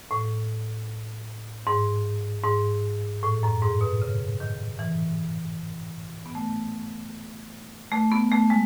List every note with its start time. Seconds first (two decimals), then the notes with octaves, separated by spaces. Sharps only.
0.11 A2
1.67 G#2
2.44 G#2
3.23 A2
3.43 F#2
3.62 G#2
3.81 B2
4.02 C#3
4.40 D#3
4.79 E3
6.26 B3
6.35 A3
7.92 A3
8.12 B3
8.32 A3
8.50 G#3